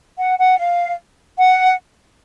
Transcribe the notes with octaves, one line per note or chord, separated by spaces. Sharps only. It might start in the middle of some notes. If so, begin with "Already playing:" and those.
F#5
F#5
F5
F#5